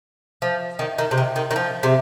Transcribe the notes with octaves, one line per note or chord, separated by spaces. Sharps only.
F3
D#3
D#3
C3
D#3
D#3
D#3
F3
C3